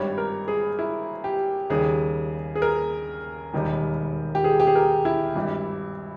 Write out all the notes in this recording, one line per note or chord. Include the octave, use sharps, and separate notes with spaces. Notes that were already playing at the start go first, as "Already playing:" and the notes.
Already playing: G#1 G2 G3 C#5
A#4
G#4
E4
G4
D#2 C#3 G3 G#4
G#4
A#4
E1 D#2 D#3 G3
G4
G#4
G4
G#4
A#4
E4
G#1 G2 G3